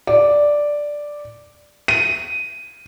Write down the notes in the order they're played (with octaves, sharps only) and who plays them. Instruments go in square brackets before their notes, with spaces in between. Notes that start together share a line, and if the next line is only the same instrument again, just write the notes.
[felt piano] D5
D#7